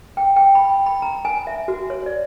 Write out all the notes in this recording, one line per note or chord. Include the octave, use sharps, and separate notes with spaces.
G5
G5
B5
G5
B5
A#5
G#5
E5
F#4
C#5
D5